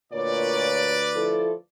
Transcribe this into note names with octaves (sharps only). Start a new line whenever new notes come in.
D2 A#2 A#4 B4 C#5 D5
F3 E4 A4